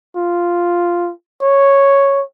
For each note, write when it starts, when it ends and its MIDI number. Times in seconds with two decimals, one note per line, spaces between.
0.16 1.11 65
1.42 2.23 73